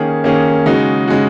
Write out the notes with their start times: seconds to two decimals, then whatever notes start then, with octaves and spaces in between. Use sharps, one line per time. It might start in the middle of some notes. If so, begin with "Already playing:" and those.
Already playing: D#3 A#3 C#4 G#4
0.24 D#3 A#3 C#4 G#4
0.66 C#3 G#3 D#4 F#4
1.08 C#3 G#3 D#4 F#4